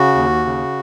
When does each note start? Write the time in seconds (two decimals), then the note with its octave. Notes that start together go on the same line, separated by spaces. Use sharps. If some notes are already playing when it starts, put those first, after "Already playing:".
Already playing: C#3 F#4
0.15 D#2
0.45 C#3